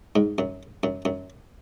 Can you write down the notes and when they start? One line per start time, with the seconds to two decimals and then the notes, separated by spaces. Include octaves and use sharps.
0.16 G#2
0.38 F#2
0.83 F#2
1.05 F#2